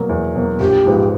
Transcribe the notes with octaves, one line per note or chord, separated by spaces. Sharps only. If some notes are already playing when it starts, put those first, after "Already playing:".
Already playing: B2 F#3 A#3
E2
B2 F#3 A#3
A#1 G4
G#2 F3 G#3 B3